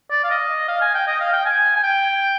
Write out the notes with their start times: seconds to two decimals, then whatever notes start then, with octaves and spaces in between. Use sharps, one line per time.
0.10 D5
0.24 F5
0.30 D#5
0.68 F5
0.81 G#5
0.94 G5
1.07 D#5
1.20 F5
1.32 G5
1.45 G#5
1.76 G#5
1.84 G5